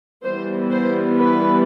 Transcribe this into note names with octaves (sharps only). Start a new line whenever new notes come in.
E3 G3 B3 C5
C5
B4